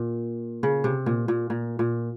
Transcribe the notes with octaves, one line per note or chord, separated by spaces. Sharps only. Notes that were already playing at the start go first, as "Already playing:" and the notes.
Already playing: A#2
C#3
C3
A#2
A#2
A#2
A#2